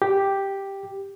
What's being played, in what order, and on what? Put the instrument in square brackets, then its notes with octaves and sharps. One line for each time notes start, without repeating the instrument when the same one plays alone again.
[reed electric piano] G4